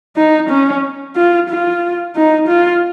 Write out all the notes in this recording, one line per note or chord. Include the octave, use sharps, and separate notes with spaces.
D#4
C#4
F4
F4
D#4
F4